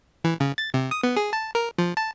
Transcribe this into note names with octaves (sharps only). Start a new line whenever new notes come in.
E3
C#3
A6
C3
D#6
B3
G#4
A5
A#4
F3
A5